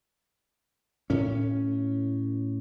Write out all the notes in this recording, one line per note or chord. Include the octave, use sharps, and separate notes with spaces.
A2 C#4